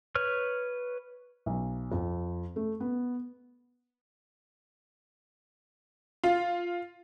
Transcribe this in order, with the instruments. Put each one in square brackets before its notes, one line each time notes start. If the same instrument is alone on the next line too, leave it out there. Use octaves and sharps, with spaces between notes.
[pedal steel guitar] B4 C#5 F6
[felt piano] B1
F2
A3
B3
[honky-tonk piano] F4